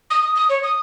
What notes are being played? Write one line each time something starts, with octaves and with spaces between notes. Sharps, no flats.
D#6
D#6
D#6
C#5
D#6